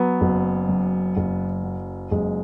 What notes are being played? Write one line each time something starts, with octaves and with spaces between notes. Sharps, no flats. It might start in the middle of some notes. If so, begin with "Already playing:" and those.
Already playing: F#3 B3
F#1
F#2
F#1
F#3
F#1 G#3